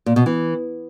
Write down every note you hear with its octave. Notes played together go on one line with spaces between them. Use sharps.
A#2
B2
E3